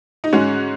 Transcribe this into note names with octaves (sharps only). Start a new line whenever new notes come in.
D#4
G#2 G#3 C#4 F#4